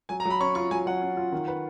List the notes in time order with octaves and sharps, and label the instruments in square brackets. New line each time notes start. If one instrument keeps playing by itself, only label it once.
[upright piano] F#3 [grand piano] G#5
[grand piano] A#5
[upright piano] F#3 [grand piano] B5
[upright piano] C#4 [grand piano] C#6
[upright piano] F4 [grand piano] C#6
[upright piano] F#3 [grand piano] G#5
[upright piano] F#3 [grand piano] F#5
[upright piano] C#4
F4
D#3
B4